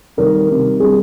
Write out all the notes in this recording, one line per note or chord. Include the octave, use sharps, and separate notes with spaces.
C3 D#3 G3 A#4
C3 D#3 G3
C3 G3 D4 G#4